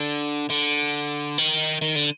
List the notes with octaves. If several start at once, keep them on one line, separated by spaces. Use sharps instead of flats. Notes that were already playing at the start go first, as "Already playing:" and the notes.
Already playing: D3
D3
D#3
D#3
D3